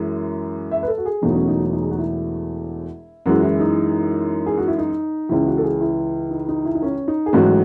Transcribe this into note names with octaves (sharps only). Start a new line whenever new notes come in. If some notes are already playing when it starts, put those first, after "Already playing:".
Already playing: F#2 E3 G#3
E5
B4
A4
F#4
G#4
E1 E2 B2 F#3 A3 D#4
C#4
D#4
E4
D#4
G#4
F#4
E4
F#2 E3 G#3 F#4
E4
D#4
G#4
F#4
E4
D#4
C#2 C#3 E3 E4
F#4
A4
G#4
E4
D#4
D#4
E4
D#4
C#4
D#4
G#4
A1 G#2 F#3 A3 F#4